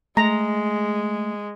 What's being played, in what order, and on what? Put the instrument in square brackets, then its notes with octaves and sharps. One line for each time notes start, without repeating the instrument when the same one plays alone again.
[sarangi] G#3 [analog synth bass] A3 [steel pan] A#5